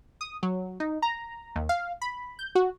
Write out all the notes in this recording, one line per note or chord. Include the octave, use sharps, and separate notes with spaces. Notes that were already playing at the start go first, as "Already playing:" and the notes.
D#6
F#3
D#4
A#5
D#2
F5
B5
G6
F#4